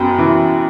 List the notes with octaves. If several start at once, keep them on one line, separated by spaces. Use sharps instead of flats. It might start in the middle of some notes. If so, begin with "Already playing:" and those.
Already playing: F#2 B3 G5 B5
E3